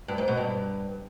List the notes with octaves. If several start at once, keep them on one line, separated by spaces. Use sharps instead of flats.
G2
G#2
B2
G2